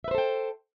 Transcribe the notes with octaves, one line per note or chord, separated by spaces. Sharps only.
A4 B4 C5 E5 G5